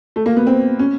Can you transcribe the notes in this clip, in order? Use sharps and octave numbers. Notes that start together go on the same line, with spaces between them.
A3
A#3
B3
C4
C#4